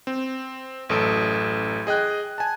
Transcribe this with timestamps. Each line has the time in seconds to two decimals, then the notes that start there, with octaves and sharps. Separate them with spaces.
0.07 C4
0.89 A1 F#2 A4 D#6 D7
1.87 G#4 D#5 G5 F#6
2.38 G#5 A5